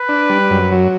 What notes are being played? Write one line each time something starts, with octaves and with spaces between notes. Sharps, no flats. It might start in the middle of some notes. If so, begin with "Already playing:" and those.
Already playing: B4
D4
G3
F#2
F#3